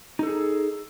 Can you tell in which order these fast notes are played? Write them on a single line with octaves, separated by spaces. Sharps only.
D#4 A4 G#4